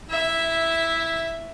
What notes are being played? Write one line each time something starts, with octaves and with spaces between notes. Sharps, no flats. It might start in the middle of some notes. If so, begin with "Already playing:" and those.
E4 E5